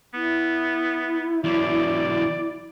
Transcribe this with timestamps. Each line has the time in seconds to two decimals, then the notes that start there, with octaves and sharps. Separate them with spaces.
0.14 B3 E4
1.44 E2 F#3 D5